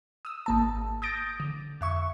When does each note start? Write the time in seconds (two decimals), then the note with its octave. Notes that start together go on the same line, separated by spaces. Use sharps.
0.25 D#6 E6
0.46 G#1 A#3 A5
1.02 D#6 G6 A6 A#6 D7
1.40 D3
1.81 F2 E5 C#6